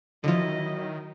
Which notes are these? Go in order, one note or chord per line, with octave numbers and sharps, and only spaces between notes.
D3 D#3 F3 F#3 E4 D#5